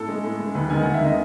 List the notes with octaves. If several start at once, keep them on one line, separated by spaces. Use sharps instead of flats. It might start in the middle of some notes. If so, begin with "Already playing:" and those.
Already playing: A2 A4
G#3
A2
G#3
D#2 B4
D#3 G#3 G#5
D#2 F#5
E5
D#3 G#3 D#5